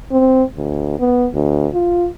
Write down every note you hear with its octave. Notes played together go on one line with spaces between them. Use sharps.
C4
D2
B3
D2
F4